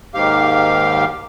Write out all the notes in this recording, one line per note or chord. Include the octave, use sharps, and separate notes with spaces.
D#2 G#2 G4 F5